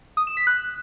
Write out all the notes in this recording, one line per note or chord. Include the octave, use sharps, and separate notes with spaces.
D#6
E7
B6
F#6